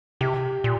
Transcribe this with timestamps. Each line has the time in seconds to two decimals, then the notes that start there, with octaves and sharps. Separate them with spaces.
0.21 C3 G4
0.64 A#2